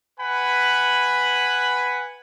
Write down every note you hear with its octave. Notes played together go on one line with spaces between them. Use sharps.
B4 F#5 G#5 B5